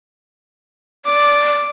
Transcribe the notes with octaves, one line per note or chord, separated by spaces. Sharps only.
D5 D6